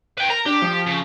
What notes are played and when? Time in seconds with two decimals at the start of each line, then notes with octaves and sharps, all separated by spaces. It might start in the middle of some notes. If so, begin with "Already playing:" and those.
0.17 B4 G5
0.30 A#4 A#5
0.46 D4 G4
0.62 F3
0.86 C#3